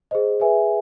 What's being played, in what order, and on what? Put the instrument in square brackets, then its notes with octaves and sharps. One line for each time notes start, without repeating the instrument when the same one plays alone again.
[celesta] G#4 C5 D#5
G#4 B4 E5 G#5